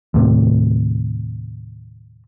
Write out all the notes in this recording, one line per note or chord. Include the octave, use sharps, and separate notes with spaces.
D#2 A2 C3